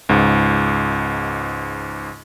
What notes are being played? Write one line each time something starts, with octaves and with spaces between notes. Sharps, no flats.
C#2 G#2